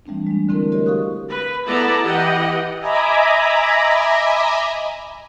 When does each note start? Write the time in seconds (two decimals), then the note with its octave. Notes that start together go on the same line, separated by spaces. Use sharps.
0.06 E3 G3 A3 C4 D4
0.27 G#3 D4
0.49 D3 A3 C4 E4 A4 A#4
0.72 F#4 G4 A#4 C5 C#5 D#5
0.86 G4 A4 F5 C#6 D#6 F#6
1.30 B4
1.66 B3 E4 A4 D5 A5 A#5
2.05 E3 G4 D#5 F#5 G5
2.78 D#5 E5 G#5 A#5 B5 D6